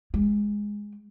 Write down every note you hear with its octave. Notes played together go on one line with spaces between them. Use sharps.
G#3